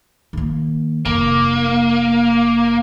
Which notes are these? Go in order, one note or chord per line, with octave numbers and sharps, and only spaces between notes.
D#3 A#3
F1 A#3